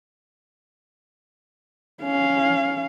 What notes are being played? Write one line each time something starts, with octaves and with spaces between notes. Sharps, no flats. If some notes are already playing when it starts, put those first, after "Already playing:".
C#4 F5